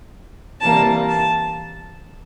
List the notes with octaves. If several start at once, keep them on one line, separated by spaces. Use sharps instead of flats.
C3 E3 G3 A#3 A5
A5